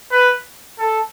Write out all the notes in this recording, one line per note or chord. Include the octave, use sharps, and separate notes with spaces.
B4
A4